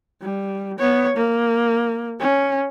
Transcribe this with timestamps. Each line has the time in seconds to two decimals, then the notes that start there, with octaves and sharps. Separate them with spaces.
0.22 G3
0.79 B3 C#5
1.17 A#3
2.20 C#4